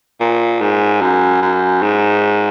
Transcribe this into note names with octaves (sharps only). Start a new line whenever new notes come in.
A#2
G#2
F#2
F#2
G#2